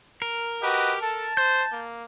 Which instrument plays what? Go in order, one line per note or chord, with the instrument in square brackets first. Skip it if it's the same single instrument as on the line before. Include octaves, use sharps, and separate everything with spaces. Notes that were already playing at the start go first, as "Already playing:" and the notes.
[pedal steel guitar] A#4
[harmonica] F#4 B4 D#5 [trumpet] G4
[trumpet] A4 [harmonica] A5
[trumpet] C5 [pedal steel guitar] G6
[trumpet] A#3